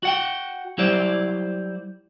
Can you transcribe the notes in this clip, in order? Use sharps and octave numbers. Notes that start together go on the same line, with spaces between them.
F#4 F#5 G5
F#3 G3 E4 G4 C5 D5